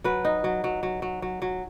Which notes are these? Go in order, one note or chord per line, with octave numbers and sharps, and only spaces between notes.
F#3 B4
D#4
F#3
F#3
F#3
F#3
F#3
F#3